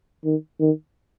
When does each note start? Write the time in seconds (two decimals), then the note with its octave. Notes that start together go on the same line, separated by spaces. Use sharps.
0.25 D#3
0.60 D#3